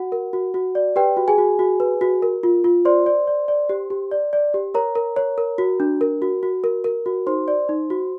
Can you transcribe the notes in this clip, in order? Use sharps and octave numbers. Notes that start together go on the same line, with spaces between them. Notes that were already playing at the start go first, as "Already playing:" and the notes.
Already playing: F#4 F#5
A#4
F#4
F#4
D5
G4 B4 G5
F#4
G#4 G#5
F#4
F#4
B4
F#4
A#4
F4
F4
C5 D5 C6
D5
D5
D5
G4
G4
D5
D5
G4
A#4 C#5 A#5
A#4
C#5
A#4
F#4
D4
A#4
F#4
F#4
A#4
A#4
F#4
D#4 C5 C6
D5
D#4
F#4